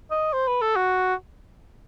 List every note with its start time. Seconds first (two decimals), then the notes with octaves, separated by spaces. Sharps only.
0.11 D#5
0.33 C5
0.47 B4
0.62 A4
0.76 F#4